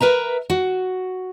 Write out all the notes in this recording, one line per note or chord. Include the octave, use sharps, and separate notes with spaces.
A#4 B4 E5 A#5
F#4